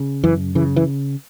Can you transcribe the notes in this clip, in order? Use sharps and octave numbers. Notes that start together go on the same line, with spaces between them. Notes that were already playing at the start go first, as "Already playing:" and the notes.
Already playing: C#3
F#2 E3
C#3 E3
E3